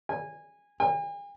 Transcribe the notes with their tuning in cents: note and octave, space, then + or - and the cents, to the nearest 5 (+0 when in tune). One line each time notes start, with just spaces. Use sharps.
G#5 -20
G#5 -45